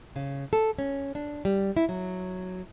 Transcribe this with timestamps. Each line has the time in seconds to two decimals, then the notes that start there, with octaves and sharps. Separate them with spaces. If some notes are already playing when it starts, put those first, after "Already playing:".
0.16 C#3
0.53 A4
0.79 C#4
1.15 D4
1.45 G3
1.77 E4
1.89 F#3